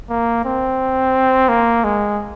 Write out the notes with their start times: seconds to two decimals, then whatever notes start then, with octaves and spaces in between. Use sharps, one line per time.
0.10 A#3
0.45 C4
1.49 A#3
1.84 G#3